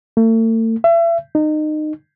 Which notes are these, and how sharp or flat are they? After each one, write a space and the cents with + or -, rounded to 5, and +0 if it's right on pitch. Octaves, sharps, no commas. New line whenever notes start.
A3 +40
E5 +35
D#4 -25